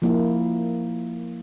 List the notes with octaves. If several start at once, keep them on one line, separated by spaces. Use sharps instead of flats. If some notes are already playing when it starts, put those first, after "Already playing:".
F3 A#3 E4